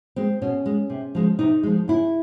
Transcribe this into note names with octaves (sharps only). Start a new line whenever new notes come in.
G#3 C4
B2 C#4
G#3
C3
F3 G#3
C3 D#4
F3 G#3
C#3 E4